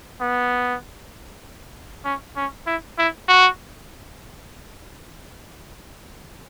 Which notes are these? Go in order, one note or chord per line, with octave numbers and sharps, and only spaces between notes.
B3
C#4
C#4
E4
E4
F#4